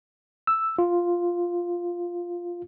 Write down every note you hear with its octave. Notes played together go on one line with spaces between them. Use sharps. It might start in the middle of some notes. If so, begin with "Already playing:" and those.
E6
F4